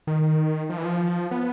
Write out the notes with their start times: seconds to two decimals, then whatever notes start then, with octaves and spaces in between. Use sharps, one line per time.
0.07 D#3
0.70 F3
0.77 E3
0.84 F3
1.31 B3